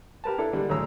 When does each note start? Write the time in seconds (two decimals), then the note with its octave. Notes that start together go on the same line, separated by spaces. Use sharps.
0.24 G4 A#4 B4 A5
0.38 D4 E4 A4
0.53 D3 G3 G#3
0.70 D2 A2 F#3 G#4 A#5 E6